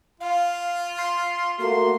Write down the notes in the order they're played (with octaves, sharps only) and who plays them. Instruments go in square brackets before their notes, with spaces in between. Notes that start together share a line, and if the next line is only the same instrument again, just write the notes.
[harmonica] F4 [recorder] F5
[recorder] C6
[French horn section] A3 A#3 F#4 [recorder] C6